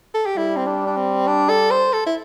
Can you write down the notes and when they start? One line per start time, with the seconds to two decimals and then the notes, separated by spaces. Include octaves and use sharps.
0.14 A4
0.26 G4
0.37 G3 E4
0.56 C4
0.67 D4
0.87 D4
0.97 C4
1.27 D4
1.49 A4
1.71 C5
1.93 A4
2.06 E4